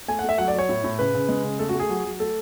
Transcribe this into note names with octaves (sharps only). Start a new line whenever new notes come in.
A3 G#5
F#5
A3
E5
F#3 F#5
D5
F#3
C#5
A2
A2
C#3 B4
C#3
G#3
C#3
A3 A4
F#4
A3
G#4
F#3
F#3
A3 A4